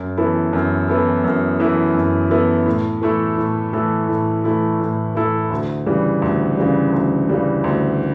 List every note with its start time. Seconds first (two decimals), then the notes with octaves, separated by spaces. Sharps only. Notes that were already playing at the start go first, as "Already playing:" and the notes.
Already playing: F#2
0.17 E3 B3 E4 A4
0.53 F#2
0.88 E3 B3 E4 A4
1.24 F#2
1.60 E3 B3 E4 A4
1.95 F#2
2.30 E3 B3 E4 A4
2.66 A2
3.02 E3 A3 E4 A4
3.37 A2
3.73 E3 A3 E4 A4
4.08 A2
4.44 E3 A3 E4 A4
4.80 A2
5.15 E3 A3 E4 A4
5.51 D2
5.86 C#3 E3 G3
6.22 D2
6.57 C#3 E3 G3
6.93 D2
7.29 C#3 E3 G3
7.64 D2